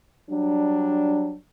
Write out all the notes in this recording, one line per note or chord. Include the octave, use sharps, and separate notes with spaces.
F#3 G3 D4